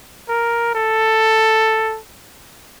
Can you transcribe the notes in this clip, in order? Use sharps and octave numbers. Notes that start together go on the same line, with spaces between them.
A#4
A4